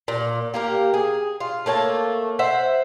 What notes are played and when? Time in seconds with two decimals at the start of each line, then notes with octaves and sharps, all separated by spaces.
0.08 A#2
0.54 A#3 G4 A#4
0.94 G#4
1.40 F4
1.66 A3 A#3 C#5 A5
2.39 C5 E5 F#5